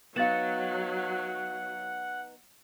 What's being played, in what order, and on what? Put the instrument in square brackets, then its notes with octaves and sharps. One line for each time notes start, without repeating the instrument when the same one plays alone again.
[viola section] F#3 [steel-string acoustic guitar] B3 D#4 [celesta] F5 A6 E7 [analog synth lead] F#5